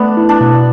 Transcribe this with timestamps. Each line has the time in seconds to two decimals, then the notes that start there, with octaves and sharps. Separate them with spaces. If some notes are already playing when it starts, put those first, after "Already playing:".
Already playing: A3 B3 D4
0.17 E4
0.29 D4
0.41 B2